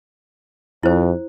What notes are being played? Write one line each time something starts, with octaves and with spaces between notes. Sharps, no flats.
F2 E4 C5